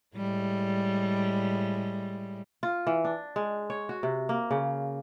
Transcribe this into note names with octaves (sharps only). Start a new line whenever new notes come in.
A2 G3 G#3
F4
E3
D4
G#3
C#5
F#4
C3
A#3
C#3